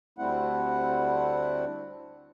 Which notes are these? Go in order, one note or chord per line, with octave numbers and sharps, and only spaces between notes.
D2 G3 A3 C4 E4 F#5